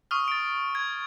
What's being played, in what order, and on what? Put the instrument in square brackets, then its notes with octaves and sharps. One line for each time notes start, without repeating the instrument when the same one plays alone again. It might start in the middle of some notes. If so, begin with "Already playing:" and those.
[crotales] C#6 D#6 F6
A6 D7
G#6